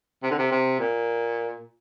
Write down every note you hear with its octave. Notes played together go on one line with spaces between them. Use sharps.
C3
D3
C3
C3
A#2